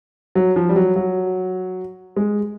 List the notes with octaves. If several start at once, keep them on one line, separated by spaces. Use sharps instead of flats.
F#3
F3
G3
F#3
F#3
G#3